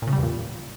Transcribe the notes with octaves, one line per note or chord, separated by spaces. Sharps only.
A#2
C#3
G3
E2
A#2